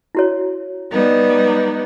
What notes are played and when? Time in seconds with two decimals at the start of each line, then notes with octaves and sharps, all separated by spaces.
0.15 E4 F#4 C#5
0.90 G3 B3 D#4